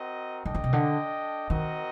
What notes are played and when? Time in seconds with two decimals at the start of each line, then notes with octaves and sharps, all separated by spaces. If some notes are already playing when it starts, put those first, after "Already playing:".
Already playing: C4 F#4 A#4 D#5
0.46 D#3 D4 A4 D#5 G5
0.55 D3
0.64 C3
0.73 D3
1.49 D#3 C4 F#4 A#4 D#5